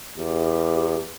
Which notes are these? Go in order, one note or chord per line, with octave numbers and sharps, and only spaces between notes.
E2 G4